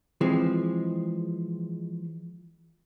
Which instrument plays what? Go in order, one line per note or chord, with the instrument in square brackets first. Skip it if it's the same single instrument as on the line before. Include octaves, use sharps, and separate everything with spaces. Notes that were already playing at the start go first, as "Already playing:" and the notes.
[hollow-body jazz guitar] E3 F3 G#3 C4